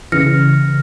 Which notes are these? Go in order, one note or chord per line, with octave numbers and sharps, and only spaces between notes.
C#3 E3 F6 A#6 C#7